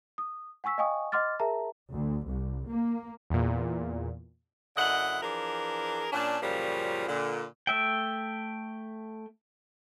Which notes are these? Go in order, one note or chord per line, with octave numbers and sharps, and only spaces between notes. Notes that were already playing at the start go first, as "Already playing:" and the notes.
D#6
F#5 G#5 C#6 E6 B6
D#5 F5 G5 G#5 C#6 D#6
D#5 F#5 C6 D6 F6 A6
G#4 A#4 E5 A5 A#5
D2
C2
A#3
E2 A#2
F#2 D3 E4 D#5 F#5
E3 F3 D4 G#4 A#4
A#2 C#4 D4
F#2 A#2 C#3 F3 G3
A#2 D3
A3 E5 G5